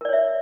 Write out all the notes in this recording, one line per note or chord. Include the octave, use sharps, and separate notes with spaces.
A#4 C#5 D5 E5